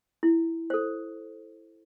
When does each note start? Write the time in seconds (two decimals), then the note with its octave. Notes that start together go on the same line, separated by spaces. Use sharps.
0.23 E4
0.70 A4 C5